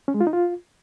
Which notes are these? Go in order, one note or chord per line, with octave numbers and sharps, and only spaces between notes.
C#4
G#3
F4
D#4
F4